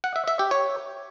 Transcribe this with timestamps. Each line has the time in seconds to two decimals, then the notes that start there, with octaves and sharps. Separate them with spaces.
0.04 F#5
0.16 E5
0.28 E5
0.39 G4
0.51 C#5